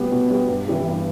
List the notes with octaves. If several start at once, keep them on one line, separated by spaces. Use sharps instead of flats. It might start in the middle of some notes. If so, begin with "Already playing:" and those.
Already playing: B2 G3 B3 G4
B2
G3 B3 G4
G2
E3 G3 E4 G4
G2